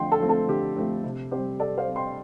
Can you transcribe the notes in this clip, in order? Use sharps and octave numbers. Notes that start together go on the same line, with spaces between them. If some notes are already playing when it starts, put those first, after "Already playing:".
Already playing: D3 F3 A3 C4 G5 C6
A4
F3 A3 C4
A4
D3 G4
F3 A3 C4
C3
G3 C4 G4 C5
C3 A4 D5
C5 F5
G3 C4
G5 C6